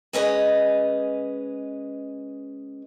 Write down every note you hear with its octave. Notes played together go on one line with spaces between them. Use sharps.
G#3 C#4 B4 D#5